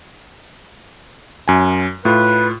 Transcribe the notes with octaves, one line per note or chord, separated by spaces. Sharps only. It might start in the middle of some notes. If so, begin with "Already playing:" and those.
F#2 G#5
A2 F4 B4